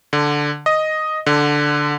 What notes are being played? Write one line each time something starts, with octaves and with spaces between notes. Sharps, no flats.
D3
D#5
D3